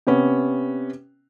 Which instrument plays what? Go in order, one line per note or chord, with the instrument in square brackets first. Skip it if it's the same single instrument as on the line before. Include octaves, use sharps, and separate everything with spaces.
[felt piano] C3 B3 C#4